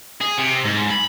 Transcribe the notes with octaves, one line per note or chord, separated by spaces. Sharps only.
G#4
C3
G#2
B5